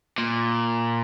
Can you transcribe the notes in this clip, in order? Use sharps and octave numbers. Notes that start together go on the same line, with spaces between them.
A#2